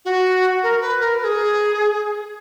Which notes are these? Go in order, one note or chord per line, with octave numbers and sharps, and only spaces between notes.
F#4
A#4
B4
A#4
A#4
G#4